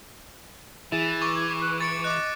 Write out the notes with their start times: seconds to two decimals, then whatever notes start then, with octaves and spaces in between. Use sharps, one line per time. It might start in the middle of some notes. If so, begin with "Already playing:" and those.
0.92 E3 E4 G#4 A6
1.22 C#6 D6
1.36 G#6
1.61 F#6
1.81 C#6 A6 C#7 D7
2.04 D#5 D6 F#6